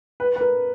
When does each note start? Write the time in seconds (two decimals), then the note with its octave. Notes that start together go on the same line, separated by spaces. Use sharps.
0.20 B4
0.36 B4
0.41 A#4